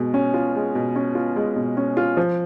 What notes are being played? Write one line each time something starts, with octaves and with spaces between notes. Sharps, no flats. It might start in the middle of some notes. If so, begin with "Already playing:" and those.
Already playing: B2 G#3
C#4
F4
G#3
B2
C#4
F4
G#3
B2
C#4
F4
F3